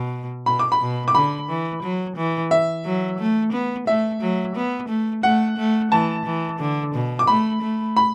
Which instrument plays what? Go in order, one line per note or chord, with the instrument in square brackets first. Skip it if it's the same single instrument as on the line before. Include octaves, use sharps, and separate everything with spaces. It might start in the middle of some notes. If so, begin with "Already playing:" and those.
Already playing: [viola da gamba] B2
[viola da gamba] B2 [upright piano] B5
[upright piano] D6
B5
[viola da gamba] B2
[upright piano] D6
[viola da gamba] D3 [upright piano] B5
[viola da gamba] E3
F#3
E3
[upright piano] E5
[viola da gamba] F#3
A3
B3
[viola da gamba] A3 [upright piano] E5
[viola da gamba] F#3
B3
A3
[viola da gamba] A3 [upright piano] F#5
[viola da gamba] A3
[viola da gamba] E3 [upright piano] A5
[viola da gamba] E3
D3
B2
[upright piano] D6
[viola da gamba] A3 [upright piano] B5
[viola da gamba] A3
[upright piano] B5